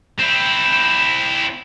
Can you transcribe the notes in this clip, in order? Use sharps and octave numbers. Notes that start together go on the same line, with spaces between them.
C4 E4